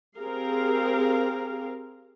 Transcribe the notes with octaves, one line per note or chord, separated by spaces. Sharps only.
C4 G4 G#4 A#4 F5